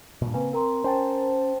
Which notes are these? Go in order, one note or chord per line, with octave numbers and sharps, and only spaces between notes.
G2 A#2
C#3 A#3 C4 B4 G#5
C4 A#4 A#5 C6
C#4 C5 G5 A5